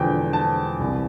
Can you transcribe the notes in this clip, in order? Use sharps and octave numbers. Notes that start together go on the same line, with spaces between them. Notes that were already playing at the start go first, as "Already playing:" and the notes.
Already playing: E1 E2 D3 F3 G5
A5
C2 C3 E3